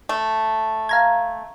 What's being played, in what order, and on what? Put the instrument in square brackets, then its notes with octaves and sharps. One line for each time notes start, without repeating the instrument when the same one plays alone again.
[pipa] A3
[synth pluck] F5 A#5 G#6